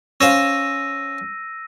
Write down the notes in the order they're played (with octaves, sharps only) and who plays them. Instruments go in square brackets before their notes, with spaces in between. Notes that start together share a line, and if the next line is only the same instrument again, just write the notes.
[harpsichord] C#4 C5 F5 [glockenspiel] E6 A#6 D#7